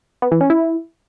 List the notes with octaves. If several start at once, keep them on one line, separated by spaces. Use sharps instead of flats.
B3
E3
C#4
E4